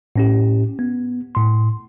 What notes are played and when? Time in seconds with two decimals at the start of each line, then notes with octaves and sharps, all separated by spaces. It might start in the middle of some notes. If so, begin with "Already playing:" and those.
0.16 A2 C#4 G4
0.79 B3
1.35 A2 C6